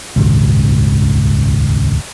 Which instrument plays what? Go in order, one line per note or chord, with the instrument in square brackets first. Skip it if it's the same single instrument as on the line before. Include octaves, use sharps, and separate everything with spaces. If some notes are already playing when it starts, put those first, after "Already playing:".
[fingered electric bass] D#1 G#1 C#2